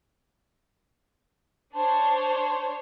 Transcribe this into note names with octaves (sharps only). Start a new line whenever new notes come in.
D4 C5 C#5 A5